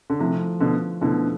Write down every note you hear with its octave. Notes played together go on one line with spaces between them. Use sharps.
D3
C3 F3 A3 E4
B2 D3
B2 D3 F3 A3 E4